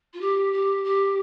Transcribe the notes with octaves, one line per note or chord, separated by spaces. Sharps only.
F4
G4
G4
G4